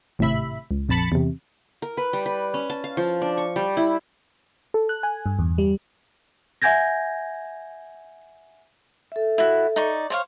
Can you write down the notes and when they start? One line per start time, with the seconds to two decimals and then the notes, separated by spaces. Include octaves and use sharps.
0.19 G#1 A2 C3 E5 B5
0.71 C#2
0.89 A#1 F2 A5 B5 A6 C#7
1.12 E2 C3
1.82 A#4
1.97 B4
2.13 G3
2.26 B4
2.54 C#4
2.70 A5
2.84 F5
2.97 F3
3.22 D4
3.37 C#6
3.56 G3
3.77 E4
4.74 A4
4.89 F#6
5.03 G#5
5.26 G2
5.39 E2
5.58 G3
6.62 E5 F#5 G#5 G6 G#6 A#6
9.12 A4 E5
9.38 E4 F#4
9.76 D#4 D5 C#6
10.10 C5 C#5 F5